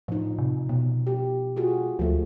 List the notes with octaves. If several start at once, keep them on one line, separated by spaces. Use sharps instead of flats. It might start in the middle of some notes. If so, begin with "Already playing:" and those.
A2 F3 D#4
C3
B2 B3
G4
F4 F#4 G#4
D2 F3 A3